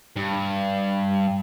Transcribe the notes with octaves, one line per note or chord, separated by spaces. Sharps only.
G2